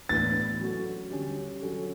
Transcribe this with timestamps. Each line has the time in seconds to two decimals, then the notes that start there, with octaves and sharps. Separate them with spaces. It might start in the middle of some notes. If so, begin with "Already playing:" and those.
0.09 A2 E3 B3 D4 A6
0.61 F#3 C#4 F#4 A4
1.11 D3 G3 C#4 G4
1.62 F#3 C#4 F#4 A4